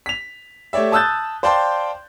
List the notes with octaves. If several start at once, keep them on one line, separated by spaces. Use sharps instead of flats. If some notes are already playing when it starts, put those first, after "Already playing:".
B6 F7
A3 G4 C#5 D5 E5
A5 D#6 E6 F#6 G6 A6
C5 D5 F5 G5 A5 C6